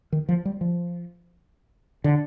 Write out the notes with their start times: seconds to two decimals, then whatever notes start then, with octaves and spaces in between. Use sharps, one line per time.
0.12 D#3
0.29 F3
0.45 G3
0.61 F3
2.04 D3